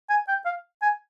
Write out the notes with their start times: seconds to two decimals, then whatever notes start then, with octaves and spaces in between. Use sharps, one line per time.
0.10 G#5
0.28 G5
0.45 F5
0.82 G#5